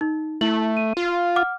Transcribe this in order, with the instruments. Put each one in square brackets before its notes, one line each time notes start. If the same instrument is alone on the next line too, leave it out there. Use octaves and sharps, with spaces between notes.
[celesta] D#4
[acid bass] A3 [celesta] E4 F#7
[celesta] D#7
[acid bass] F4
[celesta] F#5 D6 F6